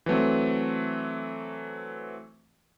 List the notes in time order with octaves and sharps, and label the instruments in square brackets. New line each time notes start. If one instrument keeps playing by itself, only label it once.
[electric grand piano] E3 F#3 A3 C4